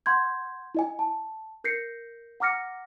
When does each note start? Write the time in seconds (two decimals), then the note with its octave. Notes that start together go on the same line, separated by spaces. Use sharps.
0.06 F#5 C6 G6 G#6
0.75 E4 D#5 G#5
0.99 A5
1.64 A#4 G6 A#6 C7 C#7
2.40 F#5 A#5 D6 F6 A#6 C#7